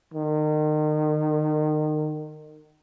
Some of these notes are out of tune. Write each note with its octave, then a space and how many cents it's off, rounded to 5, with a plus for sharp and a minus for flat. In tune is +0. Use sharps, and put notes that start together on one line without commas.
D#3 -30